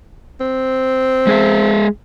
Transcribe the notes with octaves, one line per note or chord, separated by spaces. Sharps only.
C4
G#3 G#4 E5